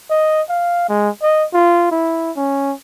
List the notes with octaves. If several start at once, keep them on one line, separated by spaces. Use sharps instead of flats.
D#5
F5
G#3
D#5
F4
E4
C#4